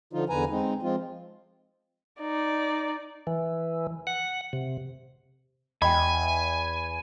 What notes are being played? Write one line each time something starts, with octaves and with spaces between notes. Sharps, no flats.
D3 F3 D#4 F4
E2 D3 B4 G#5 A#5
G#3 C4 D#4
F3 G#3 C4 F4
D#4 D5
E3
F#5
C3
E2 D#5 G5 G#5 B5